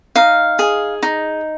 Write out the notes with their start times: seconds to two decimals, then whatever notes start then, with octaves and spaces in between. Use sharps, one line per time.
0.16 D#4 F5
0.59 G#4
1.03 D#4